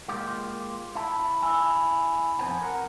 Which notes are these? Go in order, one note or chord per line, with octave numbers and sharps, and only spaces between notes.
G#3 A#3 F4 G4
E4 A5
E4 G#5
F2 B3 C4 C5 G5 G#5
A#4 F#5